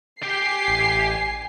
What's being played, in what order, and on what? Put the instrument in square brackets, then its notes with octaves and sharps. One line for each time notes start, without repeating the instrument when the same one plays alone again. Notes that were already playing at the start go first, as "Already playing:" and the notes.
[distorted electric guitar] G4 G5 [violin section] G#5 C7
[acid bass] A1